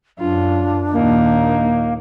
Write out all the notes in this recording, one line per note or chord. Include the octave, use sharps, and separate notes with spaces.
F#2 D4 F4
D#2 A#2 A#3 D#4